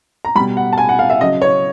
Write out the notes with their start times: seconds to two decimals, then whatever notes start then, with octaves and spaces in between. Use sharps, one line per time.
0.25 A#5
0.35 G3 B5
0.39 B2
0.57 F#5
0.73 A5
0.78 G#5
0.89 F#5
0.99 F5
1.10 E5
1.20 C#3 F#3 D#5
1.42 C#5